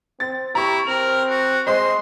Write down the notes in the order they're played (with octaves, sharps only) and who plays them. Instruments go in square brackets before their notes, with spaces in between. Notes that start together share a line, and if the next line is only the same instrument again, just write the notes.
[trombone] C4 [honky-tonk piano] A6
[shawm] E4 [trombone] G4 [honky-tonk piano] A#5 C#6
[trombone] C4 [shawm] A#4 [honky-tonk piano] F7
[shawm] F#4
[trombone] G#3 [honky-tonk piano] C5 D#5 [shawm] C6